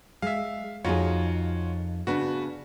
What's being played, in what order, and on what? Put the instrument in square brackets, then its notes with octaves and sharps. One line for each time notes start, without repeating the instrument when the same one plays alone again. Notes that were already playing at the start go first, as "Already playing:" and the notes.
[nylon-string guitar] G#3 [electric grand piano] E5 F5
[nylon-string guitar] F2 D#4 G#4 [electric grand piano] F4 F#4 C#5
[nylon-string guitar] C#3 B3 D4 [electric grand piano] F#4 B4